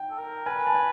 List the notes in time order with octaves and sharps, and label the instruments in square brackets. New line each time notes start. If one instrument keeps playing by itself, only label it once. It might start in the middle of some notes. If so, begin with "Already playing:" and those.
Already playing: [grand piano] G5
[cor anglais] A4
A#4
[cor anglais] B4 [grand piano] G#5
[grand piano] A5
G#5